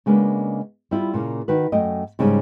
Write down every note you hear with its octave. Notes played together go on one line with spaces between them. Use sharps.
C#3 G#3 A#3 B3 D4
G3 E4 F4
A#2 C#3 A#3
D#3 F#4 B4
F#2 A3 D#5 G5
G#2 C#3 G3 C#4